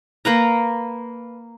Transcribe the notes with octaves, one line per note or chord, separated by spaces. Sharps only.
A#3 B4 A#5